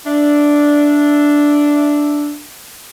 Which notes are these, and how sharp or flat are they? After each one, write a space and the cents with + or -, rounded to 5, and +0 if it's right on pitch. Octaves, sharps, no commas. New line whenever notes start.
D4 -5 E5 +0